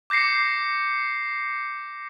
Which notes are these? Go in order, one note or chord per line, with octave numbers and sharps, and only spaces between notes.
D6 G6 A#6 C7 C#7